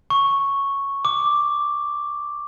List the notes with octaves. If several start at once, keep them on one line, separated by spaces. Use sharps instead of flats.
C#6
D6